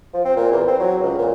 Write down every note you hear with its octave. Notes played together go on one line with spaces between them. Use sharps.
F3
C4
A#2
E2
C4
F#3
C#2
A#2